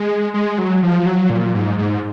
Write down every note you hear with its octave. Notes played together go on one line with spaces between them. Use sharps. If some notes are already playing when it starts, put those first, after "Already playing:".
Already playing: G#3
G#3
F#3
F3
F#3
A#2
G#2
G#2